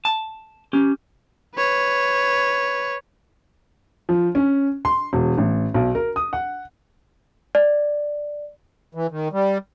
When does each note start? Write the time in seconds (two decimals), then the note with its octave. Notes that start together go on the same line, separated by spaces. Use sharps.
0.05 A5
0.73 C#4 G4
1.56 B4 C#5
4.09 F3
4.35 C#4
4.85 C6
5.13 E1
5.38 A1
5.74 B1
5.95 A#4
6.16 D#6
6.33 F#5
7.55 D5
8.95 E3
9.11 D#3
9.32 G3